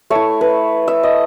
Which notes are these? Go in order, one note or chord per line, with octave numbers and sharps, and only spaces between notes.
A3 E4 C#5
B4
E5
D#5